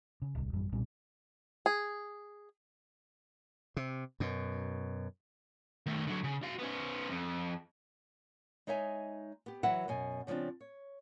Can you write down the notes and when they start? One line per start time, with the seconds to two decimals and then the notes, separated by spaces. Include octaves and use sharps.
0.22 C#3
0.35 D1 C2
0.53 A1 F#2 G3
0.72 B1 A#2 G3 C4
1.66 G#4
3.77 C3
4.20 F#2 B2
5.86 D#3 A3
6.07 D3 F#3
6.24 C#3
6.43 F#4 F5
6.58 B3 C#4
7.09 F2
8.67 G#3 D#4 C#5 E5 G#5
9.46 B3 G4
9.63 E3 F#3 B4 E5 F#5
9.88 F#2 B2 G#5
10.27 C#3 F3 A#3 C4 D4
10.61 C#5